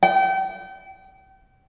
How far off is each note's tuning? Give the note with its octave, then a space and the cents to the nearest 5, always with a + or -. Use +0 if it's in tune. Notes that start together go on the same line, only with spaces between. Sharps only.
G5 -35